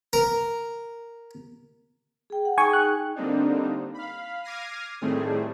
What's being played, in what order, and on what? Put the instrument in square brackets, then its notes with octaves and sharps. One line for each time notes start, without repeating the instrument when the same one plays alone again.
[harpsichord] A#4
[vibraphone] G#4 G5
F#5
[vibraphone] D#4 G#4 G5 [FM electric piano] G#5 C#6
[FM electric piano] F#6
[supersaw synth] D3 G3 A#3 C4 D4 D#4
F5 B5
D6 F6 G#6 A#6 C7 D#7
A2 D#3 G3 A3 C4 G#4